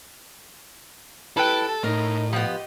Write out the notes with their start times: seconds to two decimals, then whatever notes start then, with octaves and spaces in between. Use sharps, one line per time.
1.37 E4 G4 A4 B4 G5 A5
1.84 A2 D#4 A#4 D#5
2.33 F3 B3 G4 D#5